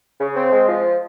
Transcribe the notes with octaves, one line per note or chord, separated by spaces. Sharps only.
C#3
C4
G#3
F3